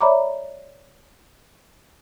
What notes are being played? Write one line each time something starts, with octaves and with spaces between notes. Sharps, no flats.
C#5 D5 E5 A#5 B5 D6